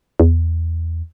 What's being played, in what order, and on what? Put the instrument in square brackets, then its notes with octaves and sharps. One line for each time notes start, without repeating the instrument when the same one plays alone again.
[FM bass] E2